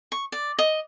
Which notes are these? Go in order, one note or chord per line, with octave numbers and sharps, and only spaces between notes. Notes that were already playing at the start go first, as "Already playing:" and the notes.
C#6
D5
D#5